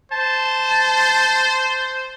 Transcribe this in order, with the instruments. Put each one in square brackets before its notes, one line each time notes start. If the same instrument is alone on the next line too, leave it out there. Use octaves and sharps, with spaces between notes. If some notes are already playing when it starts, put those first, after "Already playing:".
[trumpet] C5 [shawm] A5